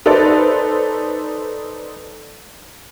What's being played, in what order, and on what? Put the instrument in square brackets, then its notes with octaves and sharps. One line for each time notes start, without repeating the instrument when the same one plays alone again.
[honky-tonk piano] D#4 A4 B4 C5 D5